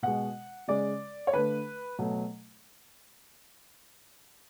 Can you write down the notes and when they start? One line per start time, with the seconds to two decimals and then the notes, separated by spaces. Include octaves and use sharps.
0.03 B2 G#3 F#5
0.68 C#3 G#3 D5
1.27 C#5
1.33 D3 A3 B4
1.99 B2 F#3 A3